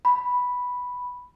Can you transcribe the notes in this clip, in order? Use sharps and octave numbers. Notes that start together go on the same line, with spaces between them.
B5